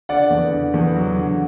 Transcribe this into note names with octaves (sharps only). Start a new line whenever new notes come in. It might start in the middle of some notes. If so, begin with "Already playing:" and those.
D3 D5 F#5
E2
D3
E2
F#3
D3